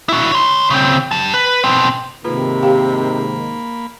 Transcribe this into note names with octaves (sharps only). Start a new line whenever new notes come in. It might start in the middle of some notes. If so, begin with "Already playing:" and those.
E4 F#4
C#5 C6
C#3 C4
G4 A5
B4
B2 C4
G#2 C3 D#3 A#3 F4 B4 B5
G4 F5 G5